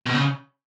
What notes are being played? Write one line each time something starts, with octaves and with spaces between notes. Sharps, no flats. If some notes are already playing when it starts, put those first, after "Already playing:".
B2
C#3